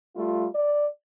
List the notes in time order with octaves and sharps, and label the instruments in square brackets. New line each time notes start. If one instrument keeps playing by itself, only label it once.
[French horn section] G3 A3 F4
D5